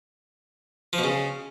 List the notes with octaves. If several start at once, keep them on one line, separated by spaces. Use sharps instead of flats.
F3
B2
C#3